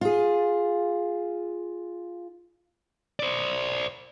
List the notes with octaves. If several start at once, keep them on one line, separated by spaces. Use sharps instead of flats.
F4 G#4
C5 D5